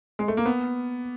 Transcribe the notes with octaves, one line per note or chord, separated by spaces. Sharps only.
G#3
A3
A#3
B3